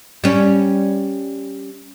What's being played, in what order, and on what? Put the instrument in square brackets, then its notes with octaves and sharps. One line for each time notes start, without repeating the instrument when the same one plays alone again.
[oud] G3 C#4